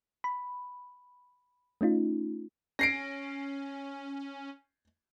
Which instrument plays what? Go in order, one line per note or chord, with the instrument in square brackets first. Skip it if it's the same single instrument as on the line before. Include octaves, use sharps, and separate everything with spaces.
[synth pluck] B5
A3 C#4 D#4 F4
[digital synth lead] C#4 [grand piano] A#6 C7 D7